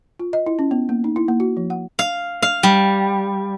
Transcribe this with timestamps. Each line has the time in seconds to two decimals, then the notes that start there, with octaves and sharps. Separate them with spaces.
0.20 F4
0.33 D#5
0.46 E4
0.59 C#4
0.71 B3
0.89 A#3
1.04 D#4
1.16 E4
1.28 A#3
1.40 F#4
1.57 F3
1.70 F#5
1.99 F5
2.42 F5
2.63 G3